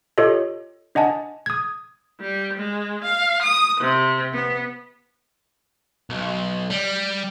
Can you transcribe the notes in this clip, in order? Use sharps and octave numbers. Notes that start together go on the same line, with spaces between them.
F4 G4 A4 C#5 D#5
D4 D#5 F#5 G#5 A5
D#6 G#6
G3
G#3
F5
D#6
C3
B3
B1
G3